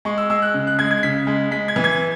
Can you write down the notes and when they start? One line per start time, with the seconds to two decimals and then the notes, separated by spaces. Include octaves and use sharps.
0.05 G#3 C#6
0.18 E6
0.30 G#3 E6
0.42 F#6
0.54 C#3
0.67 F#6
0.79 G#3 G#6
0.91 G#6
1.03 C#3 B6
1.27 G#3
1.51 G#3 B6
1.68 G#6
1.76 E3
1.84 G#6